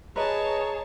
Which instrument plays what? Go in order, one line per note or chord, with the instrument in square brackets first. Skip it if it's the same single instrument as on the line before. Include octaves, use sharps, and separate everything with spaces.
[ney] G#4 [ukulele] B4 D#5 [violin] C#5 A5 [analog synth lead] A#5